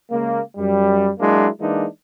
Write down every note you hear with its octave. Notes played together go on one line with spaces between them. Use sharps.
C#3 G#3 A#3
F#2 G3
F#3 G#3 A#3 D4 E4
E3 G#3 A#3 D4 D#4